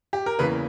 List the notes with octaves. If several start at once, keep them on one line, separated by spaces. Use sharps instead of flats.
G4
A#4
E2 C#3 E3 A#3 B4